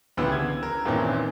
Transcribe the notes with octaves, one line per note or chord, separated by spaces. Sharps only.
C#2 D3 E3 B3 G4 E6
G#6
A#4
G2 A#2 D#3 E3 C4 C#4